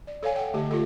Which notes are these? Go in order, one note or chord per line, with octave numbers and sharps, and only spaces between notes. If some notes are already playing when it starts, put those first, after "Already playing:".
D5
A4 C#5 F5 G#5
F#5 G5
D3 A3 G4 D#5
F4 A4